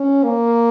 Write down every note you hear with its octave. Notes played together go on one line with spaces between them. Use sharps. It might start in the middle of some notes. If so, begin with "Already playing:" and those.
Already playing: C#4
A#3